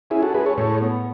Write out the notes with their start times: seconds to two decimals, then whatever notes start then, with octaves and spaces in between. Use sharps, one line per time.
0.10 C#4 E4 G#4
0.22 F#4 A4
0.34 G#3 G#4 B4
0.46 A4 C#5
0.57 A2 A4 C#5
0.81 B3